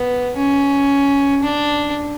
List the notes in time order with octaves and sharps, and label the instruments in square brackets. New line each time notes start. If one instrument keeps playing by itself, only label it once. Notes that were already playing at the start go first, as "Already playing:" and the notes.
Already playing: [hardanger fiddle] B3
C#4
D4